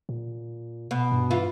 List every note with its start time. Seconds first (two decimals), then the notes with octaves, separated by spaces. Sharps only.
0.09 A#2
0.91 B2
1.12 G2
1.31 E3 F4